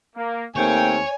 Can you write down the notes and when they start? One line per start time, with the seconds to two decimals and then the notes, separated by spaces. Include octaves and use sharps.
0.16 A#3
0.56 D#2 A3 A#3 C4 C#5 G5 G#5